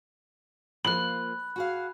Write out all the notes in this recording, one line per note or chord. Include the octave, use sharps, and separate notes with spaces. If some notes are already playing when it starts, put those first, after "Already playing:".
F3 A#3 B5 F#6 F#7
F#4 G#4 F5